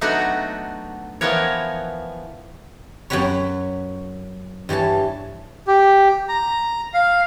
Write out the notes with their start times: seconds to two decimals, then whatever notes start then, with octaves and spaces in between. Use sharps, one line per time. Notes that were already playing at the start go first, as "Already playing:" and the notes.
0.01 F#3 A3 B3 D4 D#4 F#4
1.21 E3 F3 B3 A#4 C#5
3.10 F#2 F#3 F#4 B4 C#5
4.69 G2 E3 C#5 A5
5.67 G4
6.28 A#5
6.94 F5